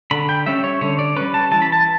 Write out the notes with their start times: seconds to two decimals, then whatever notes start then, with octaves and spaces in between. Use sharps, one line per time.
0.11 D3 B5
0.29 G5
0.46 G3 C#4 E5
0.64 C#5
0.81 D3 C#5
0.99 D5
1.16 G3 C#4 B4
1.34 A5
1.51 E3 A5
1.62 B5
1.72 A5